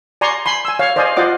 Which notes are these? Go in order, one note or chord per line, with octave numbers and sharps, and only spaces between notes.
D5 G#5 A#5 C6 C#6
G#5 B5 C6
G#5 E6
C#5 F5
C5 D5 D#5 F5 G#5
F4 C5 D5 D#5 F#5 D6